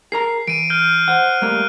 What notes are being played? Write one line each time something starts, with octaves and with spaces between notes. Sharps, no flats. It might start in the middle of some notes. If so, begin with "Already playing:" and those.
G#4 A#4 A#5 C7
E3 D7 D#7
F6 G6 D#7
C5 F#5 F#6
G3 A3 A#3